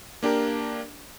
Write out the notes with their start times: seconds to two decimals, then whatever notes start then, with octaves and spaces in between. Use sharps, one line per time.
0.23 A#3 D4 G4 A#4